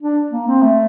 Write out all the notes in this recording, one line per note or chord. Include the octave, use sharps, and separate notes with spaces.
D4
A#3
C4
A3